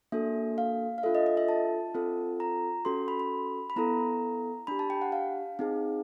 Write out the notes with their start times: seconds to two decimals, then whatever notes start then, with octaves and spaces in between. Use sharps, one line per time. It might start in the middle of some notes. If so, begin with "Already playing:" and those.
0.12 A#3 D4 F#4 A4 E5
0.58 F5
0.98 F5
1.03 D4 F4 A4 E5
1.15 D#5
1.26 D#5
1.37 E5
1.49 A5
1.94 C4 F4 A4
2.40 A#5
2.85 C#4 F#4 A4 C6
3.08 B5
3.20 B5
3.70 B5
3.76 B3 E4 A4 A#5
4.67 D4 G4 B5
4.79 A5
4.90 G5
5.02 F#5
5.12 F5
5.59 C4 D#4 G#4